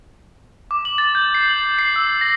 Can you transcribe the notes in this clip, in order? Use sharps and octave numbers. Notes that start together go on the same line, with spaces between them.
D6
F#7
A6
G6
C7
F#7
C7
E6
A#6